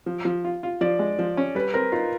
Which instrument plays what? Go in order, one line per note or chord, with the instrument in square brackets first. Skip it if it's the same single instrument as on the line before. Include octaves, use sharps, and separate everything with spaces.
[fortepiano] F3
F3
F4
F4
[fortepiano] F3 [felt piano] D5
[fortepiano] G#3
F3
C#4
[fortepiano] G3 [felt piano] B4
[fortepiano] C4 [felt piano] A#4
[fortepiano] D#4 [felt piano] F4